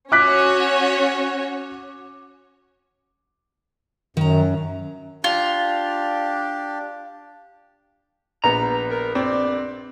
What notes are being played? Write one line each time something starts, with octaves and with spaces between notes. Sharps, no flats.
C#4 F#4 C#5 D6 F#6 B6
F#2 D#3 A#5
D4 F4 G4
A#1 B3 A#5
A#4
C4 D5